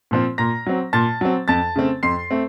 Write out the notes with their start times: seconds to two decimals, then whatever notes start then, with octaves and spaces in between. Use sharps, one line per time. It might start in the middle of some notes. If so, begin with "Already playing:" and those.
0.11 A#2 F3 C4
0.38 A#2 A#5 A#6
0.66 F#3 C4
0.93 A#2 A5 A6
1.21 F#3 C4
1.48 F2 A5 A6
1.76 C#3 A3 C4
2.03 F2 C6 C7
2.31 A3 C4